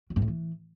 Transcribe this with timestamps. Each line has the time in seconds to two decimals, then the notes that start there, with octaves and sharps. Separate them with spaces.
0.10 F#3
0.16 G2
0.22 A2
0.28 E3